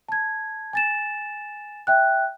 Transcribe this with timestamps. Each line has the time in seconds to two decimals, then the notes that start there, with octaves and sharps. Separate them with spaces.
0.09 A5 G#6
0.73 G#5 A6 E7
1.87 E5 G5 F#6